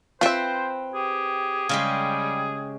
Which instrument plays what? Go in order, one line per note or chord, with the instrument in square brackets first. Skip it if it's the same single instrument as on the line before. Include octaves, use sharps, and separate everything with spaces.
[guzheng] C4 B4 [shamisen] F4 E5 [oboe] C5
[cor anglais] G4 [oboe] G#4
[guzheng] C#3 G#3 G4 [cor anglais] G3